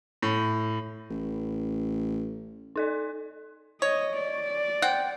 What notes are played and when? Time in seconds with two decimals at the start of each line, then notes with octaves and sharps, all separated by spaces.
0.22 A2
1.10 A1
2.76 D#4 A4 D5
3.82 C#5 D#5
4.17 D5
4.82 C4 F#5 G5